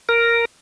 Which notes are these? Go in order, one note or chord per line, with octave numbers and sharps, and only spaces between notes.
A#4